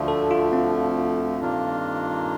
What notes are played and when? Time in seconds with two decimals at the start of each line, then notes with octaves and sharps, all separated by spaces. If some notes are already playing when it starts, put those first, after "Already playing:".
Already playing: D2 D3 F3 A3
0.08 A4
0.31 F4
0.53 C4
1.40 G2 D#3 A#3 D4 F4